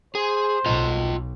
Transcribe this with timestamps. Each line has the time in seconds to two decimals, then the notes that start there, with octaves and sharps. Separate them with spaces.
0.15 G#4 C5
0.66 B1 F4 D#5